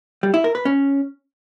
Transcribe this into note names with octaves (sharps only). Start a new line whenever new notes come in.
G3
E4
A#4
B4
C#4